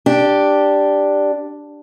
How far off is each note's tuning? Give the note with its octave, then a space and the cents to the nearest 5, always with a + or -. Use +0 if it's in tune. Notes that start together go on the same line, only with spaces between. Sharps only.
D4 +0 G4 +0